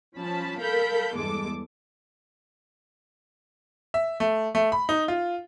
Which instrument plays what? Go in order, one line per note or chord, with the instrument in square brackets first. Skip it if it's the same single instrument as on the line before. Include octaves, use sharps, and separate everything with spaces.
[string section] F3 C#4 A5 B5
A4 A#4 F5 B5 G6
E2 G2 G#3 A4 D6
[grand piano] E5
A3
A3
B5
D#4
F4